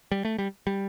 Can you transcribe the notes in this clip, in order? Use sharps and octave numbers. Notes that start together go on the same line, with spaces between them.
G3
A3
G3
G3